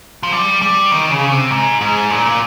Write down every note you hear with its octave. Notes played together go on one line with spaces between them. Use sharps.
F3
G3
G3
D#3
C#3
C3
G#2
G#2
A#2
A#2